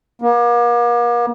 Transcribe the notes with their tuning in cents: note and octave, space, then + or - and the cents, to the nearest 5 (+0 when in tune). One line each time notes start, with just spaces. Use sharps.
A#3 +40